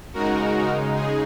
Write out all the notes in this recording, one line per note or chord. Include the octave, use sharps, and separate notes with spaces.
C#3 G#3 D#4 F#4 A#4
G#4